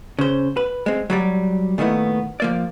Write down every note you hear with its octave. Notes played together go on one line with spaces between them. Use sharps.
C#3 C5
B4
G#3 C4
F#3 G3 D5
A#2 D#3 A3 B3 E4
F3 A#3 D5